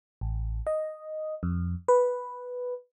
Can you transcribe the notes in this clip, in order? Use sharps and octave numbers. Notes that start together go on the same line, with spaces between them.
A1
D#5
F2
B4